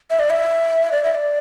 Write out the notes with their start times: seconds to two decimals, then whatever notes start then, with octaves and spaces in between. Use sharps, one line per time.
0.10 E5
0.19 D5
0.30 E5
0.92 D5
1.03 E5
1.15 D5